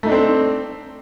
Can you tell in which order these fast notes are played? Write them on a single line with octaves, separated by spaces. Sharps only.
A3 D#4 D4 C4 C5